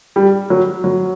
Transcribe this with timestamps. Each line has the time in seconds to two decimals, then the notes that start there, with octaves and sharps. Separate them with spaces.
0.16 G3
0.50 F#3
0.84 F#3